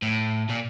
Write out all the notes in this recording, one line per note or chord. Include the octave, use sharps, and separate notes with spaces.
A2
A#2